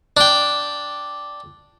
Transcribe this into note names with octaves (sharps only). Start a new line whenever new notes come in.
D4 G5